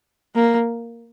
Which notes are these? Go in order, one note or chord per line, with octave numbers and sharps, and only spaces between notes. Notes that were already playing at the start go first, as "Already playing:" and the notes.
A#3